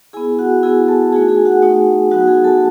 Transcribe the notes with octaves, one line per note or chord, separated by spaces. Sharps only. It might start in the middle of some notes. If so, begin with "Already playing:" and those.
B3 E4 G#4 G#5
F#4 F#5
B3 E4 G#4 G#5
A4 A5
A3 D#4 F#4 G#4 G#5
G#4 G#5
F#4 F#5
A3 D#4 F#4
F#3 B3 D#4 F#4 F#5
G#4 G#5
A4 A5